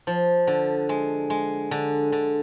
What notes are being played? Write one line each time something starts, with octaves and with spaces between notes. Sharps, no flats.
F3
D3
G#3
G#3
D3
D3